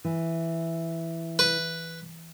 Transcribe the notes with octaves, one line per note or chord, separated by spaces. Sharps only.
E3
B4